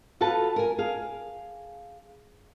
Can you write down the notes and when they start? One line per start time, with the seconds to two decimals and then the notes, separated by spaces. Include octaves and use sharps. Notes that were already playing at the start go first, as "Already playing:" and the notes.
0.21 F4 F#4 A4 B4 A5
0.56 A#4 G#5
0.78 G#4 F5